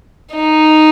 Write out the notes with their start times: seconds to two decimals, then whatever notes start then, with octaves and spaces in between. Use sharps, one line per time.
0.34 D#4